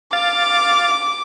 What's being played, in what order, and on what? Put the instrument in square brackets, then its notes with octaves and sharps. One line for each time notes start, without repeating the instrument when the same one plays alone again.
[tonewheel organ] F5 A6 [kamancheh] D6